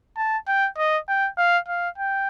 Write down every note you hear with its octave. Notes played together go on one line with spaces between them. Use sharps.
A5
G5
D#5
G5
F5
F5
G5